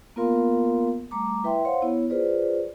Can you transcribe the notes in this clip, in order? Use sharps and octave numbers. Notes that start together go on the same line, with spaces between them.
A#3 B3 F4 A#4 F5 C6
G3 A3 A#5 D6
E4 B4 E5 G5 C6
C5 C#5 F5 F#5 C6
B3 E4 C#5
F4 G#4 B4 C5 D5